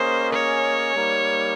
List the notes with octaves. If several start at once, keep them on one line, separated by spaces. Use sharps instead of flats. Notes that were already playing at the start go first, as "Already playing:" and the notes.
Already playing: A#3 C#4 G#4 C5 D#5
C#5
G3 A#3 D#4